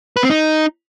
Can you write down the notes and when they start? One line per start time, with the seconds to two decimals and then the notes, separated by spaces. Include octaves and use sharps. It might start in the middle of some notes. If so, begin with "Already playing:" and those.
0.17 B4
0.23 C4
0.30 D#4